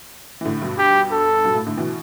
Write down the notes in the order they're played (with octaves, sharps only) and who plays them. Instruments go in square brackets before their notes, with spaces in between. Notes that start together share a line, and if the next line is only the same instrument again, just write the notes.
[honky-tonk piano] E3
A2 D3
G2 B2
[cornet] G4
A4
[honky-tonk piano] G2 B2
A2
A2 D3
B2 E3